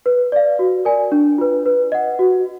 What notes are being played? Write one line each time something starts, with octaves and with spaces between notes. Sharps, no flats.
B4
D5 F5
F#4
A#4 D5 G#5
D4
F4 B4
B4
D#5 F#5
F#4